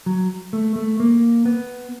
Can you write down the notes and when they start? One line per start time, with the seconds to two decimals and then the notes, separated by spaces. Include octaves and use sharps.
0.06 F#3
0.53 A3
0.76 A3
1.00 A#3
1.45 B3